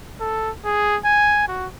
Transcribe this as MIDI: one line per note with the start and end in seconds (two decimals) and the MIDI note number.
0.21 0.51 69
0.65 0.97 68
1.05 1.47 80
1.48 1.67 66